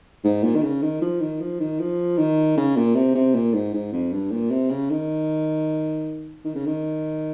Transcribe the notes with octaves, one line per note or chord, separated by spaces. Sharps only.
G#2
A#2
D#3
C#3
D#3
F3
D#3
F3
D#3
F3
D#3
C#3
A#2
C3
C3
A#2
G#2
G#2
F2
G2
A#2
C3
C#3
D#3
D#3
C#3
D#3